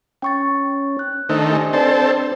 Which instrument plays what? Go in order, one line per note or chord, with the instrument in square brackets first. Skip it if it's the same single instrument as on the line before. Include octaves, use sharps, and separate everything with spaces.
[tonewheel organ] C#4 [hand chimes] G5 C#6 A6
[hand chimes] F#6
[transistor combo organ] D#3 A3 [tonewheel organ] D4 C5
[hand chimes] G4 D#5 G#5
[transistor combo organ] C4 A4 [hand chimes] B4 D5 A5